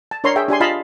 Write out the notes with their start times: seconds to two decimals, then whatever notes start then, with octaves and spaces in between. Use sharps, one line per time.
0.11 A5
0.24 D4 A#4 C#5 A#5 C6
0.36 G#4 E5 G5
0.48 D4 G4 G#5 C6
0.60 F4 D#5 F5 A5 B5 C6